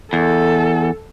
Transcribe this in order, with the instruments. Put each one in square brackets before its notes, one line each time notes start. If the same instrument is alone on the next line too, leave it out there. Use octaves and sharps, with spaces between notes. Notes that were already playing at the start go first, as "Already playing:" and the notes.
[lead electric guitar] E2 [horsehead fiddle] A4